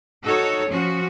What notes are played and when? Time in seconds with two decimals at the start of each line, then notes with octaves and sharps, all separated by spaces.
0.24 D#4 F#4 A4 C#5
0.68 F3 C#4 F#4